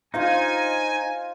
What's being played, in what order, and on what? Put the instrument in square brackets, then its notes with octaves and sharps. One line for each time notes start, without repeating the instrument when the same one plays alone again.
[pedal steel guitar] D#4 [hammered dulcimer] F4 C5 F5 [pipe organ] G#5